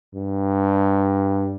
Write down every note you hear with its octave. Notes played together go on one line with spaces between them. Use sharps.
G2